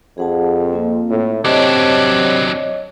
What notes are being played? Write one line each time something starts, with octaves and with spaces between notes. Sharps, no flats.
F2 G#4 F#5 A5
A#3 C4 F4
A2
C3 F#3 D4 C#5 D#5